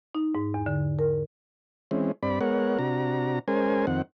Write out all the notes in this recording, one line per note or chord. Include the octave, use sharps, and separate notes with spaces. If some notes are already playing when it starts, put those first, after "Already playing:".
D#4
G#2
E2
D3
A#4
E3 G#3 C4 C#4
G2 C4 D5 B5
G#3 B3 A#4 C#5 F#5
C3 D4 F#4 A#5
G#3 C#4 A#4 C5 G#5
F2 D#3 C4 F#5